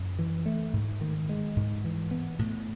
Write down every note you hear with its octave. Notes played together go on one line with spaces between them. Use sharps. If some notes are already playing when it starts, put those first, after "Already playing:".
Already playing: F#2
E3
A3
G#2
D#3
G#3
G#2
E3
B3
A2